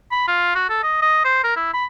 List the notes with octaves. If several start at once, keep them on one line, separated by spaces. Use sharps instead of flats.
B5
F4
F#4
A4
D#5
D#5
C5
A#4
E4
B5